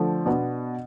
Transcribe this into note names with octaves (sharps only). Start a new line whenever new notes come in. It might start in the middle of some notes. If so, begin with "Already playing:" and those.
Already playing: D3 F3 A3
B2 B3 D4